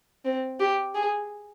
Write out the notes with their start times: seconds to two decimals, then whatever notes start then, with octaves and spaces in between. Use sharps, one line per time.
0.25 C4
0.60 G4
0.95 G#4